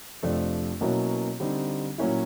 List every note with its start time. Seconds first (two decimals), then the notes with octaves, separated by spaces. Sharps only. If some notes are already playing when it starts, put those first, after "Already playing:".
0.23 F2 C3 F3 A3 D4
0.81 B2 F#3 A#3 C#4 E4
1.40 D3 G3 C4 D#4
1.98 A#2 F#3 A#3 C#4 E4